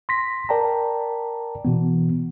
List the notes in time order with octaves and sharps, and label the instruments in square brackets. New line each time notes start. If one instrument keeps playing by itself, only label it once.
[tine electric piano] C6 A#6 B6
A#4 D5 G5 A5 A#5
B2 E3 B3